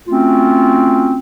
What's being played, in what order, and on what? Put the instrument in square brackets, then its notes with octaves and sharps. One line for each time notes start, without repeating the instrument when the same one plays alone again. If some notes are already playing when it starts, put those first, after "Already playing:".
[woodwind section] A3 C4 C#4 F4 F#4